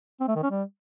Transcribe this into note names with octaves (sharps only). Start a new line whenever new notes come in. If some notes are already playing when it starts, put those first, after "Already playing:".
C4
A3
D#3
C#4
G3